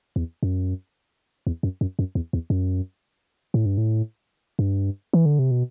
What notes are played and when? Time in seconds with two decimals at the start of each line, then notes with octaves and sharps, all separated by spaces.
0.16 E2
0.43 F#2
1.47 E2
1.63 F#2
1.81 F#2
1.99 F#2
2.15 E2
2.33 E2
2.50 F#2
3.54 A2
3.66 G2
3.78 A2
4.59 G2
5.13 E3
5.26 D3
5.39 C3
5.51 B2